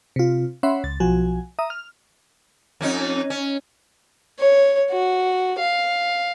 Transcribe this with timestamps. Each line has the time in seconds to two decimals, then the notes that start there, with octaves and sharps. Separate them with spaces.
0.16 C3 F4
0.63 C#4 C#5 E5 F#5 B5 C6
0.84 C#2 A6
1.00 B1 F3 F#4 G#5
1.59 E5 A#5 D#6
1.70 F6
2.81 F2 C#4 D#4
3.30 C#4
4.39 C#5
4.91 F#4
5.59 F5